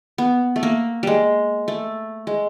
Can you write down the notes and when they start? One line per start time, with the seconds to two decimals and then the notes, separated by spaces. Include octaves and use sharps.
0.18 B3
0.56 A3
0.63 A#3
1.03 G3 G#3
1.68 A3
2.27 G#3